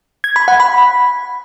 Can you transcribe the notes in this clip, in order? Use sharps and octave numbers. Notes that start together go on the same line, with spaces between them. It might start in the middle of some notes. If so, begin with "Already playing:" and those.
G#6
B5
F#5
B5